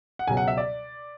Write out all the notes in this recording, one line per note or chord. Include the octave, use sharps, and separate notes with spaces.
F#5
C#2 B2 F#3 G#5
F#5
E5
D5